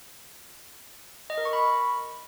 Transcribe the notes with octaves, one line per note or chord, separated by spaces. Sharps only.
D#5
A#4
C#6
B5